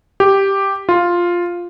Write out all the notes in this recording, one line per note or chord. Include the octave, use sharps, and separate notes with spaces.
G4
F4